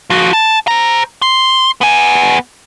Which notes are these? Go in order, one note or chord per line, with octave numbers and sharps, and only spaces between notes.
F3 F#4
A5
C5 A#5
C6
B3 G#5